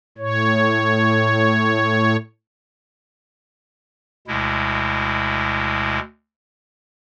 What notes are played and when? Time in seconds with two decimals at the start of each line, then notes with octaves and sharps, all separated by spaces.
0.18 A2 C#5
4.27 D2 B2 G#3 E4